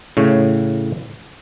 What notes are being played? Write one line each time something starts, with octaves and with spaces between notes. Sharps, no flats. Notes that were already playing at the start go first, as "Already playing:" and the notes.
A2 C#3 C#5